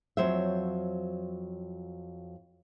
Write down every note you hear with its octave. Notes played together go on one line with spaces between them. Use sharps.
F2 F#3 C5 C#5 E5